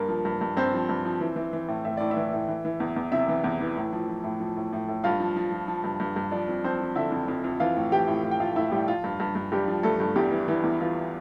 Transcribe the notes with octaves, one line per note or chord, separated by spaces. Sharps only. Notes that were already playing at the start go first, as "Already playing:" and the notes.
Already playing: G2 A#3 A#4
F3
G2
G2
G2 C4 C5
F3
G2
F3
E3
E3
E3
A2
A2 E5
A2 D5
E4 E5
E3
A2
E3
E3
E2
E2
C3 E4 E5
E3
E2
E3
A2
F3
F3
A2
F3
A2
A2
A2
G2 F4 F5
F3
F3
F3
F3
G2
G2
G2
F3 D4 D5
F2
F3 C4 C5
F3
D3 E4 E5
F2
F2
F2
E3 F4 F5
A2
E3 G4 G5
A2
A2
G5
A2 F4 F5
A2 E4 E5
A2 G3 G4
F3 F4
G2
G2
G2
G2 G3 G4
F3
G2 A3 A4
G2
E2 G3 G4
E3
E3
E2
E3 F4